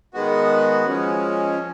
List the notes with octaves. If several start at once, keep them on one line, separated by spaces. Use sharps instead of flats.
D#3 G#3 B3 F#4
F3 G#3 C#4